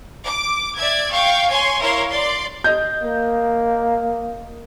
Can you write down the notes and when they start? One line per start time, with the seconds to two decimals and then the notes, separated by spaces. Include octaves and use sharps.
0.23 D6
0.77 D5 E5 G#6
1.10 F5 G5 C#6
1.48 C#5 G#5 C6 C#6
1.80 E4 A#4 C#5 F5 C6
2.09 D5 C6
2.64 D#5 G6
3.02 A#3